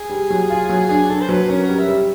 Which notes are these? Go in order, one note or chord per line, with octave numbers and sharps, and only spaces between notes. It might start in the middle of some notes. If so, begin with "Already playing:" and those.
Already playing: G#4
G3
F#3
F4
F#3
D4 G#4
D4 A4
C5
F#3 B4
C#4 A#4
A#4
G3
E5
G3